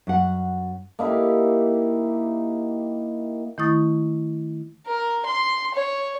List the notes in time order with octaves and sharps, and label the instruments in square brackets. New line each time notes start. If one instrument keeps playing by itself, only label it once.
[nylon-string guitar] F#2 F#5
[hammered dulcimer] A#3 D#4 E4 G4
[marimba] D#3 A3 E4 C#6 D#6 A6
[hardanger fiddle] A#4
C6
C#5